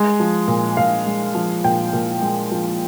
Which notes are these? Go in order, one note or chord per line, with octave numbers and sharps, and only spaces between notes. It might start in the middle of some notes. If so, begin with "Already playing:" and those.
Already playing: G#3
F3
A#2
A#2 F5
G#3
F3
A#2 G5
A#2
G#3
F3